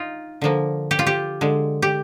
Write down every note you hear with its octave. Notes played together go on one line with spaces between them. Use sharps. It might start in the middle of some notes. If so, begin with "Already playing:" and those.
Already playing: D#4 F4
D3 F3 A#3
G4
F4
G4
D3 G#3
G4